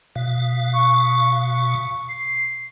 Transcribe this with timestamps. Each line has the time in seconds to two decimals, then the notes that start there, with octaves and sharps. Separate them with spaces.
0.16 B2 F5
0.73 C#6
2.08 C7